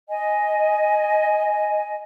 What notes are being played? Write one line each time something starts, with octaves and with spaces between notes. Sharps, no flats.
D#5 G#5